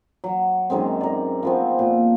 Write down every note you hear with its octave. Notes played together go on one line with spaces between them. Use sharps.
F#3
F#2 D#3 G#3 C4
A#4 D5
F3 B3 C4
A#2